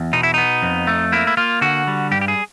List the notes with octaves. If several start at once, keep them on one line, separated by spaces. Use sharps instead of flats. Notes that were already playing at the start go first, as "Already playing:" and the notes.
Already playing: E2
B2 D#4
E4
B3 D#4
F2
A3
A#3 E4
E4
A#3 F4
D3 F#4
G3
G2 G4
G4
G#4